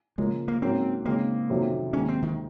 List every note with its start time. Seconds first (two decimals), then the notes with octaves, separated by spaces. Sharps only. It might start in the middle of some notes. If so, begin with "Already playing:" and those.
0.18 C#3 F3 G#3 A#3
0.48 A#3
0.62 G#2 F#3 A#3 C4 C#4
1.05 C#3 G#3 A#3 C4 D#4
1.49 F2 C3 D#3 F#3 C#4
1.93 D#2 D#3 G#3 C#4
2.09 C4
2.22 D#3